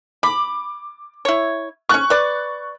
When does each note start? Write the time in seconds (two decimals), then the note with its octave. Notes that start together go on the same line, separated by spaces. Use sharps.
0.23 B5 D6
1.25 E4 C#5
1.89 B3 C#4 C#6 F#6
2.10 B4 D5